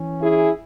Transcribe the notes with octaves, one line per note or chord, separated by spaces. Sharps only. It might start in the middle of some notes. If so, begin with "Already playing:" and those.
Already playing: E3 C#4
E4 G#4